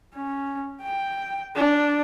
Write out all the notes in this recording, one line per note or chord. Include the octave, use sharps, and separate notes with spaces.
C#4
G5
D4